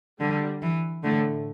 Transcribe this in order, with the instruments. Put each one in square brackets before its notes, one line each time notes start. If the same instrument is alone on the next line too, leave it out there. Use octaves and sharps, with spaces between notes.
[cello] D3 [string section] G3
[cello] E3
[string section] A2 A3 [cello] D3